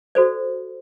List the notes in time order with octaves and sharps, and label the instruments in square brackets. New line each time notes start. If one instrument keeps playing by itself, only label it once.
[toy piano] F#4 A4 C5 D5